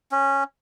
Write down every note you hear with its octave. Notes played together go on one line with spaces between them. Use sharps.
C#4